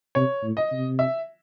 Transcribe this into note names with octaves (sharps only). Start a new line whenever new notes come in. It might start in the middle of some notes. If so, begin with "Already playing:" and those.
C3 C#5
A2
D#5
C3
E5